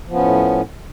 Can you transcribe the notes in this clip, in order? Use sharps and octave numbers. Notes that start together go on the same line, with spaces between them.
A2 F3 B3 C#4